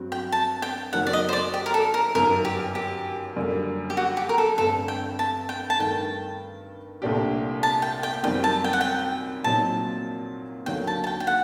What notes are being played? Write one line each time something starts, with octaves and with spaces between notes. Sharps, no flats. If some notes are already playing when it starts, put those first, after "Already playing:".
Already playing: G2 F#3 C4 F#4
G5
A5
G5
F#1 F#2 D#3 F#3 F#5
D5
D#5
C5
D5
G4
A#4
A4
A#4
G1 F#2 D#3 A#4
G4
G4
F#2 D3 G3 A#3
G4
F#4
G4
A#4
A4
G1 G2 D3 A3 C4 A4
G5
A5
G5
A5
G2 D#3 A3 G5
C2 A#2 A3 D4 G4
A5
G5
G5
F#2 D#3 G3 C4 G5
A5
G5
F#5
G5
A#1 A#2 F#3 C4 D#4 A5
D#2 D3 F#3 A#3 G5
A5
A5
G5
G5
F#5